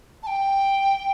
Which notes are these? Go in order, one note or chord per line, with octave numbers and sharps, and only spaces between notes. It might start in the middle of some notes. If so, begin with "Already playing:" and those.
A5
G5